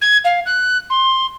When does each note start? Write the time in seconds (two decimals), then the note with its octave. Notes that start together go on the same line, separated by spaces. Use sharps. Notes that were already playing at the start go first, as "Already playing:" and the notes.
0.01 G#6
0.25 F5
0.46 F#6
0.90 C6